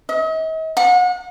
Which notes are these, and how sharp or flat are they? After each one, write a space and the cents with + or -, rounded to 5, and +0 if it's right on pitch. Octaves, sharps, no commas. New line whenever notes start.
D#5 +45
F#5 -35